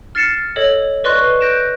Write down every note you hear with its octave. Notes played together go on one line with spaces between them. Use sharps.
F6 A6 C7 C#7 E7
A4 C#5 D#5
B4 D5 D#5 C6 C#6 F#6
F#6 G6 A#6 D7 E7